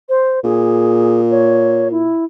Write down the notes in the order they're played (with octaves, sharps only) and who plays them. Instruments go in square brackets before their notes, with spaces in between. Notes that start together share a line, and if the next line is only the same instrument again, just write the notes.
[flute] C5
[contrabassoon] A#2 [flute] G#4
[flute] C#5
E4